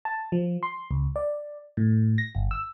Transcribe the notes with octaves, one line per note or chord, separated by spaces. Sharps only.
A5
F3
C6
C#2
D5
A2
A#6
G1
E6